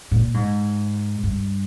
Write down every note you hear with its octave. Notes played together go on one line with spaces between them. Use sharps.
A#2
G#2
G2